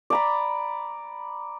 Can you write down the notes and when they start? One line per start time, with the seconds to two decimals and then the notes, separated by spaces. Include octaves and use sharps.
0.10 D5 A#5 B5